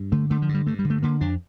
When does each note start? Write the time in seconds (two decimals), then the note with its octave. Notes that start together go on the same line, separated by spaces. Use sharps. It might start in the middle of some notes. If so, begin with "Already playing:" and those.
Already playing: G2
0.12 D3 A3
0.30 D3 A3
0.42 F3
0.49 G2
0.54 G3
0.67 G2 A3
0.79 G3
0.84 D3
0.90 A3
1.03 D3 A#3
1.21 F2 D4